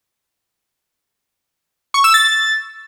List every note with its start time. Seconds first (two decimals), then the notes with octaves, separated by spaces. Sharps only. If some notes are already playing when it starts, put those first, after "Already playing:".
1.94 C#6
2.04 E6
2.14 A6